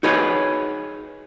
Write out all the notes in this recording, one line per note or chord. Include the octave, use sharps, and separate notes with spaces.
D#4 F#4 G#4 B4 C#5 D#5